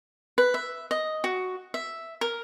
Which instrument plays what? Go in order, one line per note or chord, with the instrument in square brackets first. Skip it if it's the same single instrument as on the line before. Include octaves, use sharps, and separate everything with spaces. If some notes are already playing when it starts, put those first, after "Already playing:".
[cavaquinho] B4
E5
D#5
F#4
E5
A#4